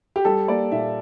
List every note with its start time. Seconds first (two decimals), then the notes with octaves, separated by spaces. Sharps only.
0.16 G4
0.25 G3 A4
0.48 A#3 D5
0.72 A#2 E5